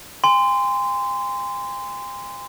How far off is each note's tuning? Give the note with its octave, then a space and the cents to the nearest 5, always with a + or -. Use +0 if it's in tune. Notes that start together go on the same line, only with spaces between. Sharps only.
G#5 -45 C6 -20